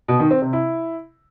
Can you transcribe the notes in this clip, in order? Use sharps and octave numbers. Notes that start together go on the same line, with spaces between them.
B2
D#3
C4
C3
E4